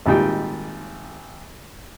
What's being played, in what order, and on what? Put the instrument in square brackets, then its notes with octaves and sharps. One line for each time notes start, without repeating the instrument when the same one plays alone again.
[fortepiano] G#1 A#2 G3 D#4 G5